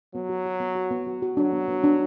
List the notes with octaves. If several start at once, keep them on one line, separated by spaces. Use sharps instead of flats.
F#3 B3
F#4
F#4
B3
F#4
B3
F#4
F#4
F#3 D4
B3
B3
D4